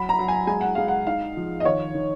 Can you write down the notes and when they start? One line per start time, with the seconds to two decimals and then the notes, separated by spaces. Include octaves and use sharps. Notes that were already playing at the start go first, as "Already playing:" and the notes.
Already playing: F#3 B5
0.09 A#5
0.19 F#3
0.28 G#5
0.47 G#3 G#5
0.61 F#5
0.75 G#3 F5
0.88 F#5
1.06 D#4 F5
1.36 F3
1.60 D#5
1.65 D#3 C#5
1.94 D#3